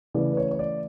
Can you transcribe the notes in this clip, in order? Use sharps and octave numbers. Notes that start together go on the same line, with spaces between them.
C#3 E3 A3 D5
B4
C#5
C#5
D5